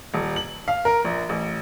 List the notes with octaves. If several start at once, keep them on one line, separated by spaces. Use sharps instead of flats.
D#1
F#7
F5
A#4
A#1
A1